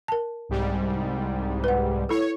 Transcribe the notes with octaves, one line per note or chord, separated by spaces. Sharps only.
A#4 A5
C2 G#2 G3
B4 F#5
E4 A4 C#5